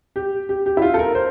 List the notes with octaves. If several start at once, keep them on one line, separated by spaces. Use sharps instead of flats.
G4
G4
G4
E4
F4
A4
A#4
C5